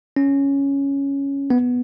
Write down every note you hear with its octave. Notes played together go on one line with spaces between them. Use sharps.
C#4
B3